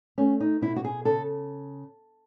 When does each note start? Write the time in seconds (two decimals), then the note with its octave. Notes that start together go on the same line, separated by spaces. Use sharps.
0.18 A3 C#4
0.40 D#4
0.61 B2 E4
0.76 F#4
0.84 G#4
1.05 C#3 A4